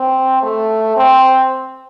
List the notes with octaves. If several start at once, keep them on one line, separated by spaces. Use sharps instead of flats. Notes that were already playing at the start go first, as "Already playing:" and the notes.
Already playing: C4
A3
C4